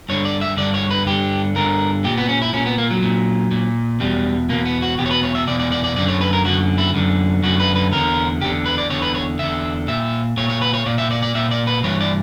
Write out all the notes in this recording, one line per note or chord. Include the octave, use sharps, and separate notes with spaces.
G2 D3 C#5
D5
E5
G2 D3 D5
C#5
B4
G2 D3 G4
G2 D3 A#4
A#2 G4
B3
C#4
E4
A#2 C#4
B3
A#3
F#3
A#2
A#2
E2 B2 G3
E2 B2 A#3
B3
F#4
E2 B2 G4
C#5
B4
C#5
E5
E2 B2 D5
D5
D5
D5
F#2 D3 D5
C#5
B4
A#4
F#2 D3 F#4
E4
F#2 D3
F#2 D3 F#4
B4
B4
E2 D3 A#4
E2 D3 G4
B4
D5
E2 D3 C#5
B4
C#5
E2 D3 E5
A#2 E5
A#2 C#5
C#5
B4
C#5
A#2 D5
E5
D5
D5
A#2 E5
D5
B4
G2 E3 C#5
D5